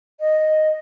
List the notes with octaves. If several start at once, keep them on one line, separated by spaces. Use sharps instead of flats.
D#5